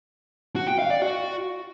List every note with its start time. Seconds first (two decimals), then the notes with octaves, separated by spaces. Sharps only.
0.56 F#4
0.67 G5
0.79 F5
0.90 D5
1.02 F#4